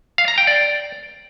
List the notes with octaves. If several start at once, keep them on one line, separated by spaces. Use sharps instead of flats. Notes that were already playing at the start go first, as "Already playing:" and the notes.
F5
A#5
G5
D5